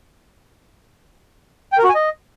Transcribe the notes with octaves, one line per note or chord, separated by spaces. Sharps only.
G5
A#4
F#4
G#5
D#5